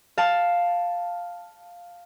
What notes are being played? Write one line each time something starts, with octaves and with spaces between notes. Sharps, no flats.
F5 A5